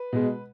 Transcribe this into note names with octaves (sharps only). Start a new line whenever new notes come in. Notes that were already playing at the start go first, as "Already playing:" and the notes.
Already playing: B4
B2 G#3